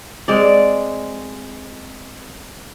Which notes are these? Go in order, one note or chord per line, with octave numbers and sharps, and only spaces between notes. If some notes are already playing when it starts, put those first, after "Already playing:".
G#3 C4 D5